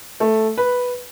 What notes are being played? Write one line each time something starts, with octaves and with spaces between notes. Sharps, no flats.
A3
B4